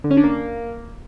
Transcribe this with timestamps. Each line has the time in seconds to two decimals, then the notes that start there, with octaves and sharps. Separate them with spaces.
0.04 D3
0.11 C#4
0.17 D4
0.24 A#3